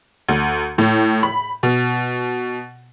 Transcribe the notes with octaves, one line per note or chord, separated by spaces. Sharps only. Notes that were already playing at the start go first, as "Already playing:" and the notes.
D2
A2
B5
B2